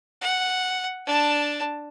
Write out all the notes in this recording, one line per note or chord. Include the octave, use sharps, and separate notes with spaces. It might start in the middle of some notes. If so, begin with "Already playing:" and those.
F#5
D4 A5